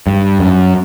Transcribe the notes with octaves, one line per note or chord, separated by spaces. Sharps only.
G2
F#2